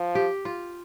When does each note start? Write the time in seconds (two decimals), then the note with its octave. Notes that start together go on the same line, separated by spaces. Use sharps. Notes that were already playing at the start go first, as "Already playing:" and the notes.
Already playing: F3
0.15 G4
0.45 F4